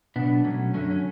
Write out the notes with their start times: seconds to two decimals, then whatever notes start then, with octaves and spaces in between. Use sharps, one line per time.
0.16 B2 F#3 B3 D4
0.44 B2 F#3 A3 C#4
0.74 F#2 D3 F#3 A3 C#4
0.91 C#4